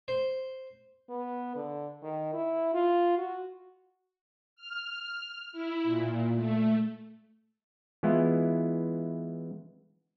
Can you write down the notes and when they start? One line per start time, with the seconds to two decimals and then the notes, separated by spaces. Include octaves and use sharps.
0.08 C5
1.10 B3
1.56 D3
2.03 D#3
2.33 E4
2.74 F4
3.17 F#4
4.56 F6
5.52 E4
5.84 A#2
6.35 A3
8.03 E3 G#3 B3 E4 F4